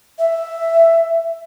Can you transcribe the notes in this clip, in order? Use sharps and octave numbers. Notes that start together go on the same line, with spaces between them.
E5